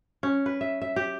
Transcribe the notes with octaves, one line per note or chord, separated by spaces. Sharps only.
C#4
B4
E5
E5
G4